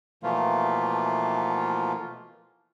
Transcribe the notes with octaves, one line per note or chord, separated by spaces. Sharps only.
B2 E3 F3 A3 A#3 F4